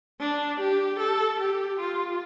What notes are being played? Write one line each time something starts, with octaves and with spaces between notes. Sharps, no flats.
D4
G4
A4
G4
F4